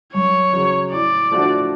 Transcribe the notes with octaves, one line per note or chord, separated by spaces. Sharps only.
F#2 C#5
C#3 F#3
A2 D5
F3 A3 D4 F#4